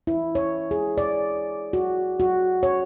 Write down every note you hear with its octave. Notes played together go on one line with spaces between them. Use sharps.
E4
C#5
G#4
D5
F#4
F#4
C#5